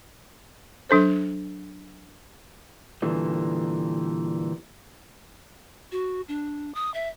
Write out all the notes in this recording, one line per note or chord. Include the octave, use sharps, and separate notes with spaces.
F#3 D4 A4 C5
A#2 D3 E3 G3
F#4
D4
D#6
E5